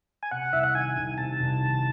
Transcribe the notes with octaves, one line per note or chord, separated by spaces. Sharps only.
G#5
C3 F#5
C2 E5
F#5
D#3 G#5
C2
C3 A5
C2
D#3